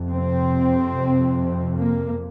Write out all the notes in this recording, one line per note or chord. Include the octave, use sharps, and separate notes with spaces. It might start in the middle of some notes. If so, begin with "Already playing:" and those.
Already playing: F2 C3
C4
A#3